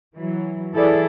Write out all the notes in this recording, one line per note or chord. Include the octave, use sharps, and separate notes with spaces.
E3 F#3
E3 E4 G#4 A4 D5